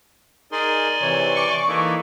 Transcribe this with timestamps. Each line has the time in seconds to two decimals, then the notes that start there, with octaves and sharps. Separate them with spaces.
0.52 D#4 G#4 A#4 D5 G#5 C6
1.01 C3 E3 C#5
1.35 C#6 D6
1.68 E3 A#3 D#4 E4 A4